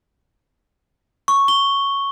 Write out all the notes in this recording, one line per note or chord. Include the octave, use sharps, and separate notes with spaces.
C#6
G7